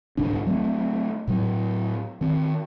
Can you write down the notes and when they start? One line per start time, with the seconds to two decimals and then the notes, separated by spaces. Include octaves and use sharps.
0.17 C2 G#2 D3 D4
0.47 F#3 A3 C4
1.28 A2 F#3
2.21 D#3 C4